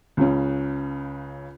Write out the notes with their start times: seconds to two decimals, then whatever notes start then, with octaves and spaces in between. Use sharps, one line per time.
0.17 C#2 C#3